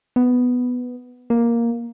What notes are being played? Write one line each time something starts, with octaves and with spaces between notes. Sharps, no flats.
B3
A#3